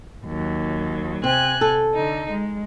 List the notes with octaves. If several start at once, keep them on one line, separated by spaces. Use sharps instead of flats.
D#2 F#3
C3 C4 G#5 F#6
A4
D3 D#4
G#3